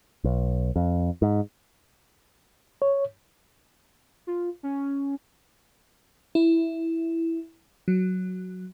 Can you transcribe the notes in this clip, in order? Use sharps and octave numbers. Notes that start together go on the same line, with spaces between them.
B1
F2
G#2
C#5
F4
C#4
E4
F#3